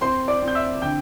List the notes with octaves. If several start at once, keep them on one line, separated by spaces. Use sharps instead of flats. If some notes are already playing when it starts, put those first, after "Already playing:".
C4 C5 C6
D5 D6
C4
G6
E5 E6
D3 G5 G6